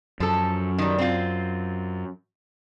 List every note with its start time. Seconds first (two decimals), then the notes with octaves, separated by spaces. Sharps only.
0.20 F#2 F3 A4
0.78 D#3 G3
0.98 C4 F4